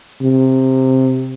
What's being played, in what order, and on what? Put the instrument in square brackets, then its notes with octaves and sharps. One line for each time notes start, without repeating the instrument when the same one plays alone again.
[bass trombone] C3